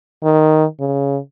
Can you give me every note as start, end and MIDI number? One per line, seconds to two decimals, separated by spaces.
0.23 0.65 51
0.80 1.18 49